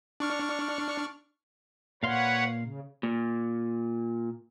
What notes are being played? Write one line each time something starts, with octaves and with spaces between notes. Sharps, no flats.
D4 C#6 F6
A#2 B4 C#5 F5 F#5 C6
C#3
A#2